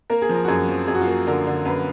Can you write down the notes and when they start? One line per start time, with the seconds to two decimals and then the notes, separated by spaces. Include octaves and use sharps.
0.10 A#3 A#4
0.22 G#4
0.29 F3
0.35 A#4
0.44 F#4
0.48 F#2 G#4
0.68 F3
0.87 F#2 G#4
0.95 F#4
1.01 F4
1.07 A#3 F#4
1.27 D3 A#4
1.47 D3
1.65 F#2 B4